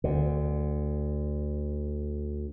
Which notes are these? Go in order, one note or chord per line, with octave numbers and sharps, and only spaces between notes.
D2 D3